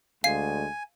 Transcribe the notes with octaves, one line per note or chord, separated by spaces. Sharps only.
D2 G#3 F5 G#5 C7